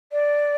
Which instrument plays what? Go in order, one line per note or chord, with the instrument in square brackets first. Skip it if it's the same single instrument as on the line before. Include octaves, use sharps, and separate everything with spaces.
[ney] D5